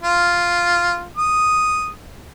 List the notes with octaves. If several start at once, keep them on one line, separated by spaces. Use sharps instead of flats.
F4
D#6